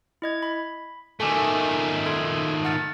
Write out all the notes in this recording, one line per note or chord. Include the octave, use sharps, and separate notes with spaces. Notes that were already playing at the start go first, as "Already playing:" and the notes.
E4 D#5 G#6
B5
D#3 A3 A4 G#5 D6
A4 C6 G#6
F#5 F6 A6